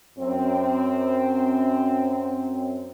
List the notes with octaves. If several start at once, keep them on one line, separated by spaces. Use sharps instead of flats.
F#2 C4